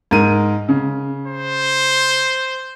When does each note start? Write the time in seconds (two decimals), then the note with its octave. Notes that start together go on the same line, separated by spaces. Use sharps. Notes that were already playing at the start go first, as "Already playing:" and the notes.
0.11 G#2 A#4 D#7
0.69 C#3
1.27 C5